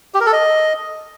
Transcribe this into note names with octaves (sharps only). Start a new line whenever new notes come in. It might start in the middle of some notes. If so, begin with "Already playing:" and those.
G4
A#4
A4
D#5